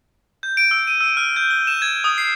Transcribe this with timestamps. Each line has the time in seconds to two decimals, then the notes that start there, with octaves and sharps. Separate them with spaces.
0.43 G6
0.57 D7
0.71 E6
0.87 D#7
1.01 E6
1.17 F6
1.36 G6
1.50 G7
1.67 E7
1.82 G#6
2.04 D#6
2.18 C7